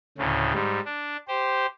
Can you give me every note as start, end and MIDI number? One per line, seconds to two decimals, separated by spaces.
0.18 0.53 38
0.18 0.53 45
0.18 0.53 49
0.53 0.80 44
0.53 0.80 55
0.85 1.17 62
1.28 1.66 67
1.28 1.66 72